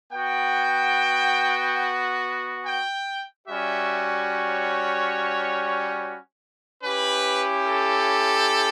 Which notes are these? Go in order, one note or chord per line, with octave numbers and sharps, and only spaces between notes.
B3 F#4 G5
G5
G3 C#4 F#4 E5
C#5
C#4 E4 G4 B4
A4